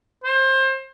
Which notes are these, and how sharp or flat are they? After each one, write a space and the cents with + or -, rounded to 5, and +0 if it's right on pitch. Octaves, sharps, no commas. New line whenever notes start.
C5 +25